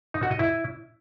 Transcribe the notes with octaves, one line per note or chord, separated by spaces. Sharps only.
D#4
F#4
D#5
E4